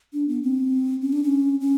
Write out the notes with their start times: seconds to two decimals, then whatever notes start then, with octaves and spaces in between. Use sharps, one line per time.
0.13 D4
0.28 B3
0.43 C4
1.01 C#4
1.13 D4
1.23 C#4
1.60 C#4